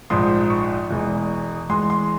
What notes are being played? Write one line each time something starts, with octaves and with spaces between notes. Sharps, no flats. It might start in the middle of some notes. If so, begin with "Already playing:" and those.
A#1 G#2 F3 C6
C#6
E1 E2 E3 G#3
E2 E3 G#3 C6
C6